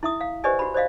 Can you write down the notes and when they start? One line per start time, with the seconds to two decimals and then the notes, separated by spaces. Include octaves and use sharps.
0.03 E4 E5 D#6
0.21 F5
0.44 G4 B4 C5 D5 D#5 G#5
0.59 F#4 B5
0.74 C5 D5 D#5 F5